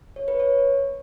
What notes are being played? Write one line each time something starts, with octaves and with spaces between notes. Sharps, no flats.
C#5
B4
C#5